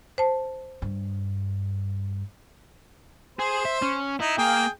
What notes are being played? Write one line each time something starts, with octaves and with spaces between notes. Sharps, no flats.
C5 A5
G2
G#4 C5
E5
C#4
D#4 E4
A#3 G#4 G5